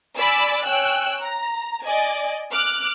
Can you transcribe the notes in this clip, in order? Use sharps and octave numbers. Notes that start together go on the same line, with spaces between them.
D5 G#5 B5 E6
C#5 G5 G#5 E6 F#6
A#5
D5 D#5 G#5
D6 F6 F#6